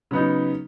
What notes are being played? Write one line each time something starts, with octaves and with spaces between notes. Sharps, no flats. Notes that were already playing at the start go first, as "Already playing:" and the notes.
C#3 F#3 B3 D#4